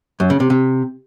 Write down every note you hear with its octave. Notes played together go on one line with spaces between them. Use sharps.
F#2
C#3
C3
C3